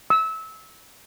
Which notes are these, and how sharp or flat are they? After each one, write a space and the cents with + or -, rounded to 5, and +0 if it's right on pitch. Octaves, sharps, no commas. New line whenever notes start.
E6 -25